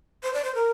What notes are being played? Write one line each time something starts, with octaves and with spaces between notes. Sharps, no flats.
C5
D5
C5
A#4